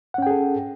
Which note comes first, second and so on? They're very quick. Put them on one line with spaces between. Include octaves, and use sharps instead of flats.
F#5 C#4 G5 G#4 A4